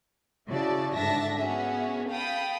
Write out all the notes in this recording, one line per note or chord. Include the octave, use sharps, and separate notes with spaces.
C#3 E4 F#4 D5 A5
G#2 D3 D4 E5 A5 A#6
B3 C#4 F#4 G#4 E5
F5 G5 A5 B5 D#6